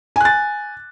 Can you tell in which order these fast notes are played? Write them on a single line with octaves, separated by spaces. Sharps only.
G#5 F#6 A6